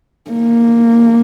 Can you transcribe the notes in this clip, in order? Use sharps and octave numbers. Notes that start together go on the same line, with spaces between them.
A#3